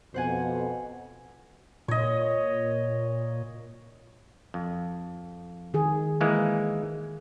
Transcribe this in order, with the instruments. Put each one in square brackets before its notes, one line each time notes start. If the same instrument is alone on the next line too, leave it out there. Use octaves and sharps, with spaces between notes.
[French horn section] F2 B2 [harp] C5 F#5 G#5
[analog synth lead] A#2 [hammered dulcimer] C#5 D#5
[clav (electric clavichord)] F2
[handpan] D#3 G#4
[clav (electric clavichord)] E3 G#3 A#3